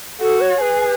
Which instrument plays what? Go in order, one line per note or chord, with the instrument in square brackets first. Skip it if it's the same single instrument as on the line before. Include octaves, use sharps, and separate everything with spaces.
[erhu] F#4 [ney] A4
[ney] C#5
[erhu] G#4 [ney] B4